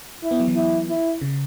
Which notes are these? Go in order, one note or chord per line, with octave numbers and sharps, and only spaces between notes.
E4
B3
F#3
E3
E4
E4
C#3